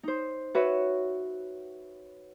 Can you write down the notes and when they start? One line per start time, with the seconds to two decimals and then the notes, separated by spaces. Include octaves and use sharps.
0.03 D#4 C5
0.55 F#4 B4 C#5 E5